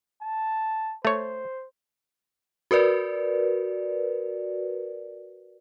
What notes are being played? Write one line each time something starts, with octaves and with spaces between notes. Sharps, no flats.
A5
A3 C5 C#5
F#4 A#4 B4 D5